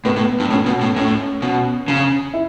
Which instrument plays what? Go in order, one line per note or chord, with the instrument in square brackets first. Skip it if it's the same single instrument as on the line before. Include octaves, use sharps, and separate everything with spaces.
[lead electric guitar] A2 [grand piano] B3
[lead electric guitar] A2
G2
[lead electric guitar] A2 [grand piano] C#4
[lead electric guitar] B2
A2
[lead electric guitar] A2 [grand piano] C#4
[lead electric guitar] B2
C#3
[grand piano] E4